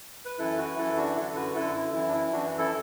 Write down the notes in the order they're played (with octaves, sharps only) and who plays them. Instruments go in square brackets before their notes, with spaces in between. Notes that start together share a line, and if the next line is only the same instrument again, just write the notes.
[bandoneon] B4
F#2 E3 E4 A4
F#4 B4
F#2 E3 E4 A4
D4 F#4
F#2 D3 E4 A4
F#4 B4
F#2 D3 E4 A4
E4
F#2 E3 E4
D4
E4
F#2 E3 D4 F#4
E4 A4